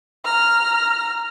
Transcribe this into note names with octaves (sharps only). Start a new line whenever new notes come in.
A#5 F6